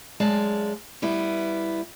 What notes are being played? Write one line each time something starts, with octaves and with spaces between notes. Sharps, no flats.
F#2 G#3 D5 F5 A5
G3 B3 E4